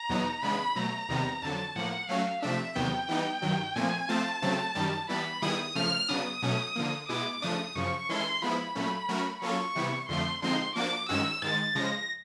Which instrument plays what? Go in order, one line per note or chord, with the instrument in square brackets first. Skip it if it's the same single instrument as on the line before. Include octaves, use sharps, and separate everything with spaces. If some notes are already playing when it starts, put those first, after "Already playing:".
Already playing: [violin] A#5
[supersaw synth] E2 B2 F#3 B3 D#4
[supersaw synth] C#3 E3 G#3 B3 D4 [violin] B5
[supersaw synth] B2 F#3 A3 [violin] A#5
[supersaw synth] E2 C3 D#3 G3 B3
[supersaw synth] F2 D3 F#3 [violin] A5
[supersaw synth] A2 F3 A#3 [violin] F#5
[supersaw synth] F#3 A3 C#4 F#4 [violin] F5
[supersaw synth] C3 F3 A3 D4 [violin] E5
[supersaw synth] E2 C3 D#3 F#3 B3 [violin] G5
[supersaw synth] E3 G3 B3 D#4
G2 D#3 F#3
[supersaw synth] A#2 F3 A3 C4 [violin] G#5
[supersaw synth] F3 A3 C4 F4 [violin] A5
[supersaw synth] C#3 F#3 A3 C4
F#2 D#3 G3
[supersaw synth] E3 G3 B3 [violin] B5
[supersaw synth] D#3 G3 B3 E4 G#4 [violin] D#6
[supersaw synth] C#3 F3 A3 [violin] F6
[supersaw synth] C#3 F#3 B3 D4 [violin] D#6
[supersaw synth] B2 F#3 A3 C#4
D3 F3 A#3
[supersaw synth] B2 G#3 B3 E4 [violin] D6
[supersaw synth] C#3 F3 A3 D4 [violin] D#6
[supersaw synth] F#2 C#3 F3 [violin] C#6
[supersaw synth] E3 G#3 C#4 E4 A4 [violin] C6
[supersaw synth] F3 G#3 B3 E4 [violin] B5
[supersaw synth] A#2 F#3 A3 C#4
F#3 A3 C#4 F#4 A#4
[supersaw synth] F#3 A#3 C#4 F4 A4 [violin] C#6
[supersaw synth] C3 E3 G3 B3 E4
[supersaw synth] F2 D3 F3 A3 [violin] C6
[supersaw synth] D3 F3 G#3 C4 D#4 [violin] C6
[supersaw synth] F3 A#3 D4 F#4 [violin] D6
[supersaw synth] G2 D#3 G#3 C#4 F#4 [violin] E6
[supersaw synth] G#2 D#3 G#3 [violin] A6
[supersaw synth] C#3 F3 G#3 [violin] A#6